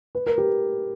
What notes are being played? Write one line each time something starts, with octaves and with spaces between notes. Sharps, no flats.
B4
A#4
G4